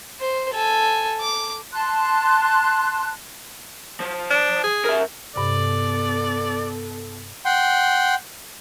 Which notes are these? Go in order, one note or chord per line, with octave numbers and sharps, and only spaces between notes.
C5
A4 G#5
D6
A5 C6 F#6
F3
D4
G#4
A#4 E5
G2 C3 B3 A4 D5
F#5 G5 C6